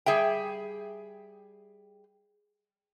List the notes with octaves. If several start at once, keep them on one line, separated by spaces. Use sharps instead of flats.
G3 G#4 E5 G5